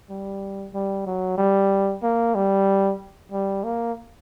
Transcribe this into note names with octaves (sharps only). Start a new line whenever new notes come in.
G3
G3
F#3
G3
A#3
G3
G3
A#3